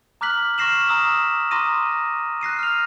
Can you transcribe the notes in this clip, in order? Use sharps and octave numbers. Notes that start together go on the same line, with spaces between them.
A#5 D6 F6 F#6 B6 F#7
C#6 F6 A#6 C7 E7 F#7
A#5 D#6 E6 B6 E7
A#5 C6 D6 D#6 A#6 D#7
F#6 A#6 C7 D#7
F6 C7 F7